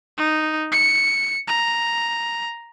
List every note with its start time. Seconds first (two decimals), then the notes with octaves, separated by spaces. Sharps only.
0.18 D#4
0.72 C#7
1.48 A#5